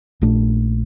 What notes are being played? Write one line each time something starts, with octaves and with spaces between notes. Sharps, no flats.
A#1 A#2 A3 D4